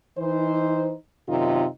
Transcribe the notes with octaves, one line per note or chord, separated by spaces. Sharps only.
E3 D#4 C5
F#2 C3 D#3 D#4 F4